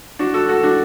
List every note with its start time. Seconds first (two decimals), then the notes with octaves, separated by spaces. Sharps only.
0.19 D4 F#4
0.34 F#4 A4
0.49 F#4 A4
0.63 D4 F#4